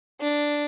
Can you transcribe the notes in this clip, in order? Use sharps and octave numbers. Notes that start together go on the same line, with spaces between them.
D4